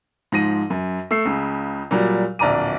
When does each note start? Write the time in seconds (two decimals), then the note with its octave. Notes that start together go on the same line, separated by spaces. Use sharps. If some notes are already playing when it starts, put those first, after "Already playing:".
0.32 G#2 F3 A#6 D#7
0.70 F#2
1.11 A3 E6 C7
1.25 C#2 C#3
1.91 A#2 F#3 G3
2.39 D1 A#1 D5 A#5 D6 D#7